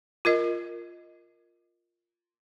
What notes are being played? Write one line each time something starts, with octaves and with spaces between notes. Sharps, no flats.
F4 A#4 D#5